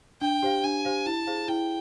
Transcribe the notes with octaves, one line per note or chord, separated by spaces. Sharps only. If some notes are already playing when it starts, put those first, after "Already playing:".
D4 G5
G4 C5 F5
D4 G#5
G4 C5 F5
E4 A5
G#4 C5 F5
E4 G5